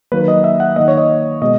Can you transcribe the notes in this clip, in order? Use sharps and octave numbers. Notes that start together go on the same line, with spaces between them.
D#3 F#3 A#3 B4
D#5
E5
F#5
D#3 A#3 D#5
C#5
D#5
B2 G#3 D#5